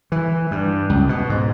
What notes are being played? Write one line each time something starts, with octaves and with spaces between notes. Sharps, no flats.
E3
G2
C#2
B2
G#2